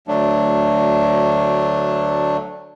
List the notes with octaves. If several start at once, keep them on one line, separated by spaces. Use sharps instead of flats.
D2 F#3 A3 D4